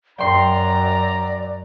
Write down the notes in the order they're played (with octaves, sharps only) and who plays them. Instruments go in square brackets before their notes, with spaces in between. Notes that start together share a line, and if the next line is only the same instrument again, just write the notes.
[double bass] F#2 F#3 [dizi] D5 [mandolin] G5 C6 [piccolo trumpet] A#5